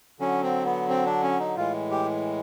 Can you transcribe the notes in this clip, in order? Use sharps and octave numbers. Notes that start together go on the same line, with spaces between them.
D3 F#3 C#4
C4
B3
C4
D4
C#4
D#4
A2 E3 G#3 F4
G4